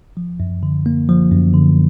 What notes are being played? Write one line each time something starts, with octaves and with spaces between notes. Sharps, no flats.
F3
F#2
D3
A#3
F3
F#2
D3